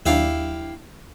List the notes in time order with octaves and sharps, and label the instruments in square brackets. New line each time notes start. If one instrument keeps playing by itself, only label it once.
[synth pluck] D#2 F#3 D4 [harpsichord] E4 G4 F5